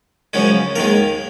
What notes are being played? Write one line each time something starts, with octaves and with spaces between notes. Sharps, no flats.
F#2 C#3 F3 G#3
D#2 D#3 G#3 A#4